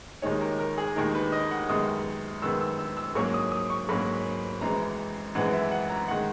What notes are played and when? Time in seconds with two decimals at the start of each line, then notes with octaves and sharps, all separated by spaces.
0.22 D#2 D#3 G#3 D#4 C#5
0.41 A#4
0.59 A#4
0.78 G#4
0.96 D#2 D#3 G#3 D#4 A#4
1.15 B4
1.32 D#5
1.51 F#5
1.69 F#2 D#3 G#3 B3 D#6
2.42 F#2 D#3 G#3 B3 E6
2.61 E6
2.79 E6
2.97 E6
3.15 G#2 F#3 A#3 C#4 C#6
3.34 D#6
3.52 D#6
3.70 C#6
3.89 G#2 F#3 A#3 C#4 B5
4.61 G#1 F#2 E3 G#3 A#5
5.35 G#1 F#2 E3 G#3 F#5
5.53 E5
5.72 F#5
5.90 A#5
6.08 D#3 G#3 F#5